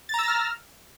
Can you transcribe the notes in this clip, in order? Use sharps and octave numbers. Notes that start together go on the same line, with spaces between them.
A#5 E6 F6 A6 A#6